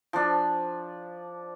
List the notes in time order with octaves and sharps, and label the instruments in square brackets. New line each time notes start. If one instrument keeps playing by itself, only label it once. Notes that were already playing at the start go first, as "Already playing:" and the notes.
[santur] F3 D4